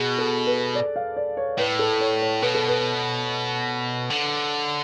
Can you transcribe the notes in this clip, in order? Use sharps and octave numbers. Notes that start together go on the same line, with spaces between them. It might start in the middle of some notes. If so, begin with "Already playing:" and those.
Already playing: B2 G#4
A4
B4
D5
F5
D5
C#5
A2 B4
A4
C#5
C#5
B2 B4
A4
B4
D3